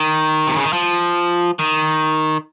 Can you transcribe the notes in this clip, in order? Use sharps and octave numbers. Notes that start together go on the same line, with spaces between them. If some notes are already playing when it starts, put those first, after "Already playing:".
Already playing: D#3
C3
C#3
D#3
F3
D#3